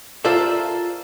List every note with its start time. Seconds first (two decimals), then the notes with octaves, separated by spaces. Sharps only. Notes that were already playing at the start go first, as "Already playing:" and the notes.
0.25 F4 A4 A#4 C5 D5 E5